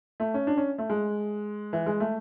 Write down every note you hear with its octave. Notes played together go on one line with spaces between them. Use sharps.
A3
C#4
D4
C#4
A3
G#3
E3
G#3
A3